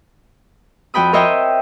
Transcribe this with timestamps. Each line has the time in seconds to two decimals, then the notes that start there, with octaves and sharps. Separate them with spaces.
0.94 F2 F#4 G5 B5 D#6
1.13 A#4 C5 C#5 D#5 E5 G5